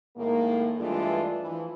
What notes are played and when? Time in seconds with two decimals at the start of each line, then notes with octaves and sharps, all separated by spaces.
0.17 A2 D#3 G#3 A#3
0.77 G2 E3 G#3 A3 D4 F4
1.41 E3 F3